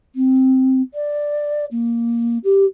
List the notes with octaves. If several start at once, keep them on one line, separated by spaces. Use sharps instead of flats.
C4
D5
A#3
G4